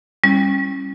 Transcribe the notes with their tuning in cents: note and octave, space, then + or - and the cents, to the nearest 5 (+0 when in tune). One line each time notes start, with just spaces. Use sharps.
G3 +15 C#4 -25 E4 +10